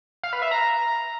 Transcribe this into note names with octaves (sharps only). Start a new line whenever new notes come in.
F5
B4
E5
A#5